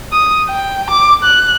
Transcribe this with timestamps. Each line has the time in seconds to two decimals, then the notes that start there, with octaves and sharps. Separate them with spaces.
0.12 D#6
0.49 G5
0.90 D6
1.23 F#6